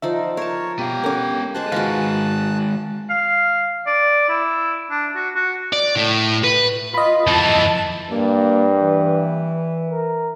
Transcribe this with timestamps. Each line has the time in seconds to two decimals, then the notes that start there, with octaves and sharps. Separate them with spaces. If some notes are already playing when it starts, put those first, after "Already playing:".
0.02 F3 D#4 D5 E5
0.37 A#4 C#5 A5
0.79 B2 B3 G4 F5
1.04 C#4 A4 A#4 F#5 D6
1.55 G#3 G#4 C5 A5 F#6
1.72 D#3 G#3 F#4 A#4 B4 F5
3.10 F5
3.86 D5
4.29 E4
4.90 D4
5.15 F#4
5.35 F#4
5.73 D5
5.96 A2
6.44 B4
6.94 F4 D#5 B5
7.27 F2 E3 A5
8.10 G2 A#3
8.81 E3
9.91 A#4